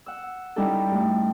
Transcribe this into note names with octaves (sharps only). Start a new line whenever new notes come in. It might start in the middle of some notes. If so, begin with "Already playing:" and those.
F#5 E6
G3 C#4 D#4 E4 A4
G2 A3